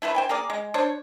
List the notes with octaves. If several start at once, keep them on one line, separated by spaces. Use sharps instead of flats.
A3 E4 B4 C5
C5 G5 G#5
A#3 G#4 A#4 D5
G#3
D4 C5 C#5